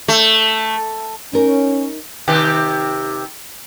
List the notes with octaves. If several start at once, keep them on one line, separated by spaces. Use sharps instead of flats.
A3
C#4 D#4 A#4
C3 D#3 G4